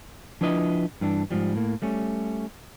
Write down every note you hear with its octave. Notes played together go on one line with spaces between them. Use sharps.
F3 D4 E4 B4 D#5
G2 E3 D4
G#2 F3 G3
A2 A#3
G3 A3 C#4